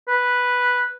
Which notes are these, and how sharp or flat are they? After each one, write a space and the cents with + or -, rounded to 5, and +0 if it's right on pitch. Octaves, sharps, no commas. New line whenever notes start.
B4 -5